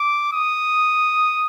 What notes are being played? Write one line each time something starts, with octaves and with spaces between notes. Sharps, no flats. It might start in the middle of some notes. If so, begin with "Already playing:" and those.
Already playing: D6
D#6